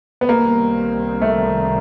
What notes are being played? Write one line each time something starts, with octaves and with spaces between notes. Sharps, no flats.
B3
C2 C3 D#3 G3 A#3 C4
A3